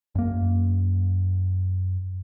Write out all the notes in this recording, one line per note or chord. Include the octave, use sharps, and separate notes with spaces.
F#2 A#3